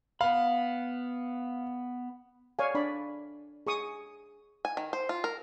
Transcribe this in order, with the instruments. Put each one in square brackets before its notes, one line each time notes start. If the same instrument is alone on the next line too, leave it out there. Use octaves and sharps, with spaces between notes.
[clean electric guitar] B3 B5 [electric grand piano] F5
[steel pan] C#5 D5 F5 G#5
D4 D5 B5
G#4 C#6 D#6
[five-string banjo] G#5
D#3
C5
F4
A#4